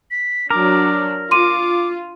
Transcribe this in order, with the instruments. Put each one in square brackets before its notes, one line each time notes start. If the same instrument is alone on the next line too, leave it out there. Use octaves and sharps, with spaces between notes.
[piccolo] B6
[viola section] F#3 D4 [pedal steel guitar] A#4 [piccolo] D6
[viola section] F4 [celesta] C6 D#7 [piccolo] D6